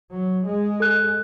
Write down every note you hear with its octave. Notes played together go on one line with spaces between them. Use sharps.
F#3
G#3
A4 F#6